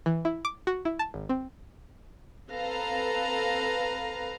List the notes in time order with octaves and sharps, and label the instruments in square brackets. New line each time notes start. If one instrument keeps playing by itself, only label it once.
[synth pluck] E3
E4
D6
F#4
E4
A5
G#1
C4
[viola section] C4 A4 B4 F5 A#5